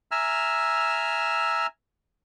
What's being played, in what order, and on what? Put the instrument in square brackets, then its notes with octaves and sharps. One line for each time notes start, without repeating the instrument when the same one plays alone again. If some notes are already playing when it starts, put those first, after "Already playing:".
[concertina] E5 G#5 A#5 E6 F6